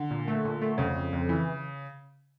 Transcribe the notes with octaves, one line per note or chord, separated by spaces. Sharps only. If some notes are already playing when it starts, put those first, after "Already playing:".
Already playing: D3
A#2
A3
A#2
A3
F2 C#3
F2
F2
E3